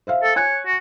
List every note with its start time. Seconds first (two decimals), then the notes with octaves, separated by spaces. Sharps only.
0.07 C5 E5 F5
0.23 A4
0.36 C#5 G#5 F#6
0.66 F#4